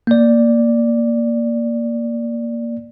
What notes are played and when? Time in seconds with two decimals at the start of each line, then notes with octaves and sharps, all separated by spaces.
0.07 A#3 D5